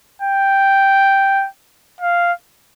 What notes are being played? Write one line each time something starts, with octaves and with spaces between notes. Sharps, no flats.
G5
F5